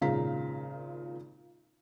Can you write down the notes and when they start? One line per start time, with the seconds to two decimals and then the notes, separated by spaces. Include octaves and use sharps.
0.01 G#1 A#2 C#3 F5 A#5 B6